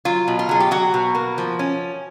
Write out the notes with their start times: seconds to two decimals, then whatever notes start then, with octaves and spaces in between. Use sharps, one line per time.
0.05 F#3 F4
0.28 B2
0.39 F4
0.49 F#3 G#4
0.60 G4
0.71 F#3 F#4
0.94 B2
1.15 A#3
1.38 F3
1.59 C#4